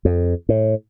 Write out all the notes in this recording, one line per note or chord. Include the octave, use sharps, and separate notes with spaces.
F2
A2